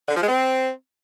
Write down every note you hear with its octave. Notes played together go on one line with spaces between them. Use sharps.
D3
F3
G#3
C4